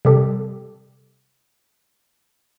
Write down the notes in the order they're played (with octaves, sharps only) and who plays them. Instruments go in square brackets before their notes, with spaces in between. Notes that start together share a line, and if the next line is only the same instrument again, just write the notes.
[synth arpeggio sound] C3 G3 G4 A4